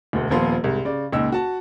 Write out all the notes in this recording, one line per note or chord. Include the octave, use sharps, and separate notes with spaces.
E1 D2
D#1 A#2 F3 B3 F4 C6
C2 G#2
C#3 D5
C#2 A#2 D#4 E6
F#4 A5